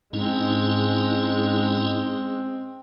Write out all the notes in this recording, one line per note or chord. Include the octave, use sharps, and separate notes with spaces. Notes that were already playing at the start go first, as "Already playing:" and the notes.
G#2 G#3 C4 C#4 D#4 E4